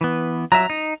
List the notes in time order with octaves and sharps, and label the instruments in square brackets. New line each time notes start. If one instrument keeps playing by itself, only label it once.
[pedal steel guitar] E3 B3
[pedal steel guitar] F#3 E5 [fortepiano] A#5
[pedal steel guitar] D#4